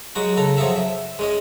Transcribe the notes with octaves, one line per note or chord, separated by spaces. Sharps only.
F#3 G#3 F#4
C#3 A4 A#5
F3 F#3 G#4 A4 E5
E5
G#3 C#4 D#5